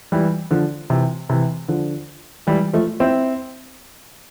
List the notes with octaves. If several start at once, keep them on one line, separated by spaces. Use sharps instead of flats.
E3 G3
D3 F3
C3 E3
C3 E3
D3 F3
E3 G3
F3 A3
C4 E4